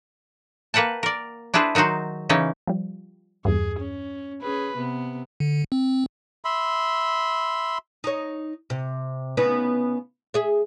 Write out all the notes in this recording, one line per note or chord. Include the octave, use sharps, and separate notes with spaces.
A#3 B4 F#5 G5 A5
A#4 D5
D4 E4 G#4 B4 C5
D#3 F#3 D#4 F#4 C5
C#3 E3 C#4 D#4
F3 G3
E2 G2 G#4
C#4
C#4 G#4 B4
C3 B3
D3
C4
E5 B5 C6
D#4 C#5
C3
C#3 B3 D#4
G#4 E5